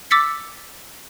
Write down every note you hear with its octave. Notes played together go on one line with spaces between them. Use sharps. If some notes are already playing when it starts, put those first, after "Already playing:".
D6 E6 A6 B6 C#7